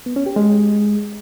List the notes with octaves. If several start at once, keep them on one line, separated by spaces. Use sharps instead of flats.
B3
C#4
G4
G#3